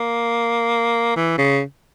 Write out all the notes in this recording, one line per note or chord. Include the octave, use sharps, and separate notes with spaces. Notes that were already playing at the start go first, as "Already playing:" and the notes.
Already playing: A#3
E3
C#3